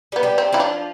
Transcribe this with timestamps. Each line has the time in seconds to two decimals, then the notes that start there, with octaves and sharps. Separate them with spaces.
0.12 G3 G4
0.16 B3
0.23 G3 G4
0.38 C4
0.52 F3 E4 F4
0.60 D4